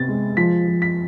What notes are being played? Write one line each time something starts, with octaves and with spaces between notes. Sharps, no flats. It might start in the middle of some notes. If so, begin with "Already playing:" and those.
Already playing: C3 B3 A6
G#3
F3 B6
F3
B6